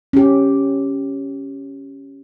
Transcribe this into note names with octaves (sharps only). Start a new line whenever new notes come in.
C#4 G4